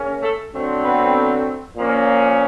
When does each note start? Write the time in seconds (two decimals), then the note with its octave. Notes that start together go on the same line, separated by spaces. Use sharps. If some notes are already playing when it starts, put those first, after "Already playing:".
Already playing: C#3 A#3 C#4
0.23 A3 A4
0.53 D3 F#3 A3 C4
0.83 B3 B4
1.75 A#2 F3 A#3 C#4